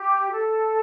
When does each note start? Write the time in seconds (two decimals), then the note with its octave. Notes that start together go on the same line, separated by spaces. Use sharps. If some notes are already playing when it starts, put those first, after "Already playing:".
Already playing: G4
0.31 A4